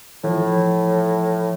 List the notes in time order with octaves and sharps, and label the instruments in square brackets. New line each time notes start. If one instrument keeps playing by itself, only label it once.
[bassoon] A2 [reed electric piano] E3 F3